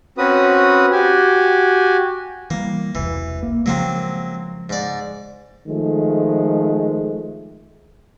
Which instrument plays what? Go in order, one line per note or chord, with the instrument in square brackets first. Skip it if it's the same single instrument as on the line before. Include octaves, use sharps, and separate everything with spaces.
[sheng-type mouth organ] C4 C#4 F#4 B4 D#6
F#4 G4 G#5
[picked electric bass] E3 G3 [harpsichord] A#3
[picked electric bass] E1 C2 [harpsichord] E3
[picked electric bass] A#3
[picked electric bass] C#3 F3 G#3 [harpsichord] F#3 A#3 C4
[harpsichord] G#2 D5
[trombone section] D#3 F3 G#3 A3